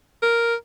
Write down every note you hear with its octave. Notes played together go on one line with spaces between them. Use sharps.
A#4